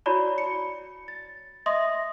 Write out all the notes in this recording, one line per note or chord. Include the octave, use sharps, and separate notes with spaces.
E4 F#4 C#5 D5 A5 B5
C#7
A6
D#5 E5 C6 D#6 A#6